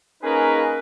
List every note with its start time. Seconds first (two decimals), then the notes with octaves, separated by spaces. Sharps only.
0.23 A#3 C#4 D#4 G#4 A#4 B4